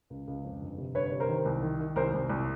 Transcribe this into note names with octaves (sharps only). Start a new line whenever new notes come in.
C#2
C#2
F2
G1
C3
G1 B4 C#5
C3
A#4 C5
D#3
C2
D#3
D#3
C2 A#4 C5
C2
C2